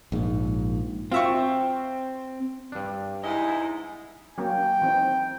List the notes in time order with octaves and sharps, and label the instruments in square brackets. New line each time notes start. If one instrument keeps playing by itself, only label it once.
[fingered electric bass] A#1 G#2
[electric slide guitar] C4 [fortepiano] F4 E5 C#6
[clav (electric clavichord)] G2 D4
[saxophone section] E2 G#2 D#5 [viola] E4 [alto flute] G#5
[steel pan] F#3 A#3 C#4 [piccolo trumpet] G5
[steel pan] E3 C4 D#4